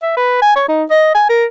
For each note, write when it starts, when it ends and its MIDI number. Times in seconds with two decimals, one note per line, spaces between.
0.02 0.15 76
0.17 0.39 71
0.42 0.54 80
0.56 0.64 73
0.68 0.84 63
0.90 1.12 75
1.15 1.25 80
1.29 1.45 70